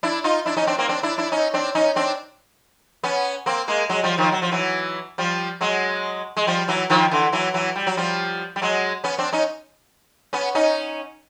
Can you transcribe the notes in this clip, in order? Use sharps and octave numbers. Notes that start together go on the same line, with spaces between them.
D4 E4
D#4 F4
D4 E4
C#4 D#4
C4 D4
A#3 C4
C4 D4
D4 E4
D4 E4
C#4 D#4
C4 D4
C#4 D#4
C4 D4
B3 C#4
A#3 C4
G#3 A#3
F#3 G#3
F3 G3
D#3 F3
F#3
F3
E3 F#3
F3 G3
F#3 G#3
G#3
F3 G3
E3 F#3
D#3 F3
D3 E3
E3 F#3
E3 F#3
G3
F#3
F3 G3
G3
F#3 G#3
B3 C#4
C4 D4
C#4 D#4
B3 C#4
C#4 D#4